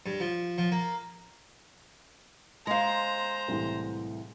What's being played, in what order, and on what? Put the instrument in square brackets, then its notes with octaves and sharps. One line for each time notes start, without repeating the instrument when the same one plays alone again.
[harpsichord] G2
F3
F3
A#3
[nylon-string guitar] G#3 F5 [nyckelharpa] C5 A#5
[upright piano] C2 A2 E3